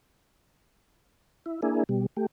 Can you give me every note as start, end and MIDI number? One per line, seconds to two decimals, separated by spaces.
1.46 1.61 64
1.62 1.83 58
1.62 1.83 62
1.62 1.83 64
1.62 1.83 68
1.89 2.06 47
1.89 2.06 55
2.17 2.26 57
2.17 2.26 67